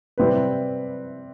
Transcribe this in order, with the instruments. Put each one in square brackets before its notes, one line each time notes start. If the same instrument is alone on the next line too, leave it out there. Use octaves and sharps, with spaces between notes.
[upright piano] C3 G3 C4 E4 B4